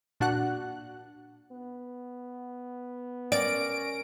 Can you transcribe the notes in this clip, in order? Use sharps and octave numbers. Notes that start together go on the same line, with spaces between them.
A#2 D4 F#4 F#5 F#6
B3
C#4 A#4 D5 D7